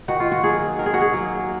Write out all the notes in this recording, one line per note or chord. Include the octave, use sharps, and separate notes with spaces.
D#3 F#4
F4
F#4
F#3 A#3 G#4
D#3 A#4
G#4
F#4
G#4
F#3 A#3